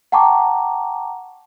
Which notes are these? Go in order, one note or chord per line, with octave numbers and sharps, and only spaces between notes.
F#5 G5 A5 A#5 C#6 D6